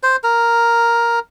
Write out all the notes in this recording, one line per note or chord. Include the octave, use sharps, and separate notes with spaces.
C5
A#4